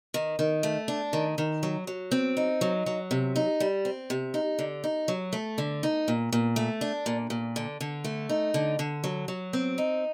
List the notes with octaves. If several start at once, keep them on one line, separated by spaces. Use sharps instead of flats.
D#3
D#3
A3
D4
D#3
D#3
F#3
F#3
C4
D#4
F#3
F#3
C3
D#4
G3
C4
C3
D#4
D3
D#4
F#3
A3
D3
D#4
A#2
A#2
A3
D4
A#2
A#2
D3
D3
A3
D#4
D3
D3
F#3
F#3
C4
D#4